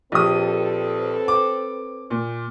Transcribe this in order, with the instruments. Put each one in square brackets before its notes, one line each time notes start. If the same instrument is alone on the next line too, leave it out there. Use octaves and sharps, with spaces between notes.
[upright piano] A#1 G4 D#6 [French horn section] C4 A4 B4
[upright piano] D6
A#2